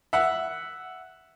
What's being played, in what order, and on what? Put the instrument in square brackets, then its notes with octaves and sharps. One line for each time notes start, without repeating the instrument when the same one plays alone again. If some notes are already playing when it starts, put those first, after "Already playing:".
[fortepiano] E5 F#5